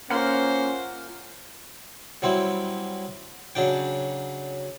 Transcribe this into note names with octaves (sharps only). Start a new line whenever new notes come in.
A#3 C#4 F4 A#4 C5 F#5
F#3 G3 C4 E4
C#3 F#3 D4 G5